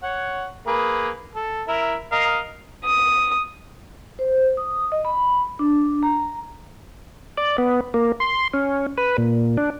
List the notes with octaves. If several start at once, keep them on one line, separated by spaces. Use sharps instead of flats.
C#5 F#5
A#3 G#4 B4
A4
E4 A#4 E5
A#4 D#5 F5
D#6
C5
D#6
D#5
B5
D4
A#5
D5
B3
A#3
C6
C#4
B4
A#2
D4